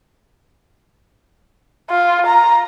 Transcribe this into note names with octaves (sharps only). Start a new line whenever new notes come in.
F4
A#5